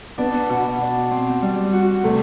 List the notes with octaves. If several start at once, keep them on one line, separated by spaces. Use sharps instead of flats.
B3 D4
B2
D4
C4
G3
F#4
C3 A3